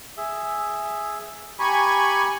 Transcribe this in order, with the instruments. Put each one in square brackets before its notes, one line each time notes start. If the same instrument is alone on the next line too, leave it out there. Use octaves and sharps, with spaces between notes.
[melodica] G#4 E5
[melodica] G4 A#5 [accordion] G#5 B5 C#6